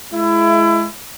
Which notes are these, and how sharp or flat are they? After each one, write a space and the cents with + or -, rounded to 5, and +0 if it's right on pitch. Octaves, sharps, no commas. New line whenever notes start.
G#3 +30 E4 +25